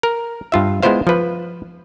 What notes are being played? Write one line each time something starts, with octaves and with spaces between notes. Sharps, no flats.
A#4
G2 F4 E5
G#3 B3 E4 F4 C5 F5
F3 B4